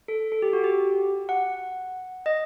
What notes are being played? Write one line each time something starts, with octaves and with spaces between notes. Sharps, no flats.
A4
A4
G4
F#4
G4
F#5
D#5